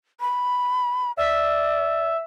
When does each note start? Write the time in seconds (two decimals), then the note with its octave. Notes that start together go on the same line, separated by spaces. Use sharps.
0.20 B5
1.17 D5 E5